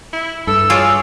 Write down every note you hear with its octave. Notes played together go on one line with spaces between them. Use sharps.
E4
G2 A4 E6
F4 G#4 C#5 D5